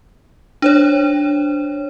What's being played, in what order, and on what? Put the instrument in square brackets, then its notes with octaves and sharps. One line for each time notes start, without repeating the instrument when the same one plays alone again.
[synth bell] D4 C5 C#5